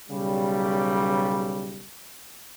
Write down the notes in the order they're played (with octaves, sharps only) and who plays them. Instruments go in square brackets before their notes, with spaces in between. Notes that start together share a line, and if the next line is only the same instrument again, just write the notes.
[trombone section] B1 C#3 G3